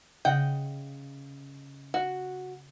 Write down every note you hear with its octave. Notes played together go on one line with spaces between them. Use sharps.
C#3 D#5 F#5 G5
F#4